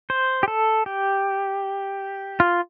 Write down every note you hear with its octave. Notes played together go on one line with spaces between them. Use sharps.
C5
G4
A4
G4
F4